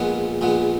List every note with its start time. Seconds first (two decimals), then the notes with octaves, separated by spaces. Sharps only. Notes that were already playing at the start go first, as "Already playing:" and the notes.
Already playing: A#1 A#2 G#3 B3
0.41 A#1 A#2 G#3 B3